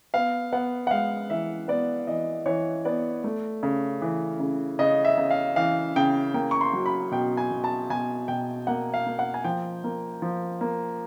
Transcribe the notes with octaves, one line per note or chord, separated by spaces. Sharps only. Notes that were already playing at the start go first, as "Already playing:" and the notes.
B3 F5
B3 F#5
F#5
G#3 F5
E3 E5
B3 D5
E3 D#5
E3 C#5
B3 D5
A3
C#3
E3
C#3
C#3 D#5
E5
C#3
F5
E3 F5
C#3 G5
A#3 G5
C#6
C6
F#3
B5
B2 G5
G#5
B2
A5
B2 G#5
B2 G5
A#3 F#5
F5
A#3
F#5
G#5
F3 G5
A#3
F3
A#3